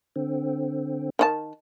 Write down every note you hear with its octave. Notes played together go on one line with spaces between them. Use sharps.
D3 C4
D#3 D#4 A5